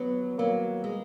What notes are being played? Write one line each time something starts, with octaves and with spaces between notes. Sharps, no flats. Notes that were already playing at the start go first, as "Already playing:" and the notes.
Already playing: F#3 B3
F#3 A#3
G#3